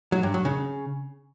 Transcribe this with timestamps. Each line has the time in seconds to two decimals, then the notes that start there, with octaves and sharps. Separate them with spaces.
0.12 F#3
0.23 G2
0.34 F#3
0.45 C#3